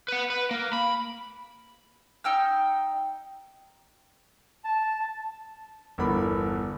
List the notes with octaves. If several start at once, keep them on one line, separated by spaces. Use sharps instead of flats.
B4 F#5
B4
A#3
B5
D#4 G5 E6 F6
A5
G1 E2 G2 A#4 B5 D6